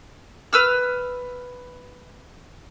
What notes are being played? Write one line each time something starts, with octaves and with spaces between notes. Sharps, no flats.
B4 E6 F6